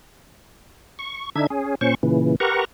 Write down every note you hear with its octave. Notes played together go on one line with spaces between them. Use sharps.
C#6
D3 D4 D#4 E5 G#6
C#4 G#4
A#2 C#4 C5 C#6
A#2 C#3 E3
G4 A#4 B4 F#5 A#5 C#6